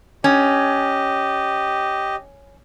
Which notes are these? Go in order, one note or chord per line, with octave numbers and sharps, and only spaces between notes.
C#4 G4 D#5